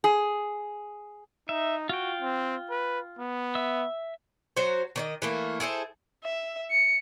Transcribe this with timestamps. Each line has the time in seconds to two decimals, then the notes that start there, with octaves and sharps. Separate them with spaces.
0.04 G#4
1.49 D#4 E5
1.89 F4 F#4 G5
2.21 C4
2.70 B4
3.19 B3
3.55 E5 E6
4.56 F#3 F#4 C5
4.96 D#3 C#5 D#5
5.22 E3 A3 A#3
5.60 E4 G#4 A4 C5
6.24 E5
6.71 C#7